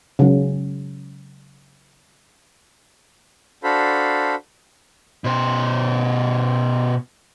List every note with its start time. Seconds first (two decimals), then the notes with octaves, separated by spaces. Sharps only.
0.19 C#3 F#3
3.64 D4 F#4 A4 C5 F5 B5
5.24 B2 C5